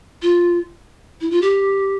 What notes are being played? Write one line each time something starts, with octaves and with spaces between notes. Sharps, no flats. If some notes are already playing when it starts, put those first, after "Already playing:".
F4
E4
F4
G4